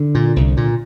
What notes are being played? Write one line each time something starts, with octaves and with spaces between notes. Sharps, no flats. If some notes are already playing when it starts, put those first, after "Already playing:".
Already playing: D3
A#2
C2
A#2